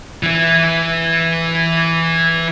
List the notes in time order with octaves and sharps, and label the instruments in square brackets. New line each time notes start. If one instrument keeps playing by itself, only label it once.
[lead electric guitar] E3 E4